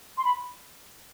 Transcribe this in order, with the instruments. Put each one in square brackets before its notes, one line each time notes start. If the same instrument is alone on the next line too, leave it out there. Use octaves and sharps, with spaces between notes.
[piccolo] C6
B5